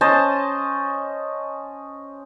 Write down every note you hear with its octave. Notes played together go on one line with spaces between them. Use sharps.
C#4 C5 D#5 A5